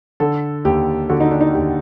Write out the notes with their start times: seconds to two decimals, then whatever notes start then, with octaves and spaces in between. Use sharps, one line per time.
0.20 D3 A4
0.65 D#2 G4
1.09 D3 F#4
1.20 D#4
1.31 D4
1.41 D#4
1.54 D#2 G4